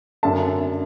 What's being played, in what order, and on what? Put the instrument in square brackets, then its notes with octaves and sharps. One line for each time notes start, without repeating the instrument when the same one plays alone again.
[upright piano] F#2 D3 A3 D4 E5 A5